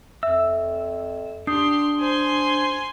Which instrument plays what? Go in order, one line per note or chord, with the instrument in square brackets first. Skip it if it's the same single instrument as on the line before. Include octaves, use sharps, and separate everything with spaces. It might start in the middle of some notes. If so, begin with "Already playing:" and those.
[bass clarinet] F2 [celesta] E5 [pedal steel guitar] E6
[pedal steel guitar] D4 [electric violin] G4 C6 [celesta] D#6 G6 C7
[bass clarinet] C5 [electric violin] G#5 C6